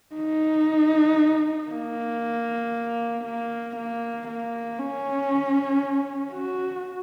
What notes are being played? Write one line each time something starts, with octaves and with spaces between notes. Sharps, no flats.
D#4
A#3
A#3
A#3
A#3
C#4
F#4